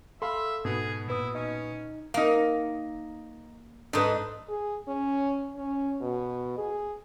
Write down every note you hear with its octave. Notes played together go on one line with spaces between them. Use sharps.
A4 E5 F5 B5 C6
G#2 B2 B3 G#4
A#2 E4 B4 D#6
C#4 D#4
A#3 D#4 F5
G#2 D4 D#4 A4 B4
G#4
C#4
C#4
B2
G#4